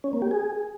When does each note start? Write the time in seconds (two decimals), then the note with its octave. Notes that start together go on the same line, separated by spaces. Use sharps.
0.04 C#4
0.13 A#3
0.22 G4
0.31 G#4